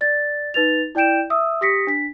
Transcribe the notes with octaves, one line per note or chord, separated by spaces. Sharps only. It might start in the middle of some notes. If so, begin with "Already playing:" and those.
D5 A6
D#4 B4 A6 F7
E4 D5 G5 G6 D7 E7
E5 D#6 E6
G4 D#6 A#6 B6 C#7
D4 B6